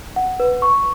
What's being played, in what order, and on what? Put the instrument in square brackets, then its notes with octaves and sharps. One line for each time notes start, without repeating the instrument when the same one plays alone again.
[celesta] F#5
B4
C#6